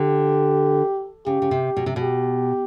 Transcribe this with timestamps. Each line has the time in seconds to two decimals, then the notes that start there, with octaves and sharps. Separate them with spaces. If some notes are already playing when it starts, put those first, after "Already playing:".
Already playing: D3 G4
1.26 C#3 G4
1.42 C#3
1.51 C3
1.77 B2
1.86 C3
1.96 B2
2.01 G4